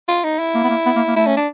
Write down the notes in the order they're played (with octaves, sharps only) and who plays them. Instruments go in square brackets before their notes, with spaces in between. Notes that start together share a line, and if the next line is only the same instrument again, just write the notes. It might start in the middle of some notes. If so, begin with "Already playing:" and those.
[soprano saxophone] F4
D#4
E4
[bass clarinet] A#3
B3
A#3
B3
A#3
A#3
[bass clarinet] A3 [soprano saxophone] E4
[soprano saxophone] C#4
D4